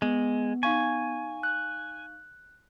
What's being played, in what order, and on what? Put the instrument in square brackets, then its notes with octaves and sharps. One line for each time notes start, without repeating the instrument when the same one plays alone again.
[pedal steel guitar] G#3 [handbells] B3
[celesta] D#4 F5 C#6 [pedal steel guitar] G#5
[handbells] F#6